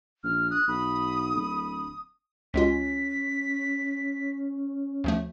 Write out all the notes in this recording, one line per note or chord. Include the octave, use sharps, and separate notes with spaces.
A#1 F6
D#6 F#6
B1 B5
D1 B5
C#2 G#3 C#4 F4 B6
D2 F3 A3